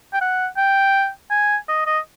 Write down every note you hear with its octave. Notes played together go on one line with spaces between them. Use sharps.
G5
F#5
G5
G#5
D#5
D#5